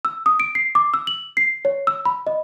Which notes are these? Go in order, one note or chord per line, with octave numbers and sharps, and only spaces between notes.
E6
D#6
D7
C7
D6
E6
F#7
C7
C#5
E6
B5
D#5